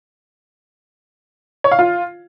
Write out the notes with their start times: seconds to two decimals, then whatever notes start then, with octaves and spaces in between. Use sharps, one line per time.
1.64 C#5
1.71 F5
1.79 F4